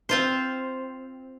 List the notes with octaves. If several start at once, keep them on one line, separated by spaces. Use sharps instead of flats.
C4 F4 C5